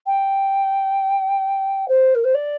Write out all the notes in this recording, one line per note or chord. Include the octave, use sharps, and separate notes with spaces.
G5
C5
A#4
C5
D5